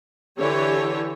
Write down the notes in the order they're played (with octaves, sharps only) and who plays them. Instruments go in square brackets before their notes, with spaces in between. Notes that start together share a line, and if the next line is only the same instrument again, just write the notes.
[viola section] D3 E3 G4 C#5